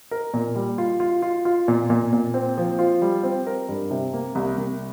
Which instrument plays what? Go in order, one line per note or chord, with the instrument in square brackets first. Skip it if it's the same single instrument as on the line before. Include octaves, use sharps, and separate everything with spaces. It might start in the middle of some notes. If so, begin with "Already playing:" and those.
[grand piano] A#4
A#2
G3
F4
F4
F4
F4
A#2
A#2
A#2
C4
F3
F4
G3
C4
A#4
G2
C3
A#3
C2
C2